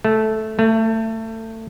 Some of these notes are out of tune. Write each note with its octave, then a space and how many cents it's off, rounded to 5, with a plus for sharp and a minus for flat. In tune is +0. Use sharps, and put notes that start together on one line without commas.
A3 -10
A3 +25